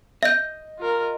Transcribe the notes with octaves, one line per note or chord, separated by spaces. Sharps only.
D#5 E5 G6
F4 A#4